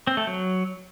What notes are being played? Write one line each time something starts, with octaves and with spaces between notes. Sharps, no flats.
C4
A3
F#3